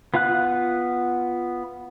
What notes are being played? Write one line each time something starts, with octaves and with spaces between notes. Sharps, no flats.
B3 F4 F5 F#5 F#6